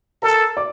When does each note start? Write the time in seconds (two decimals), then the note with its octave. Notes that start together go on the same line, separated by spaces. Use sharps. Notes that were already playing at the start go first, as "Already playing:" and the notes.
0.22 A4 A#4 A#5
0.57 D5 D6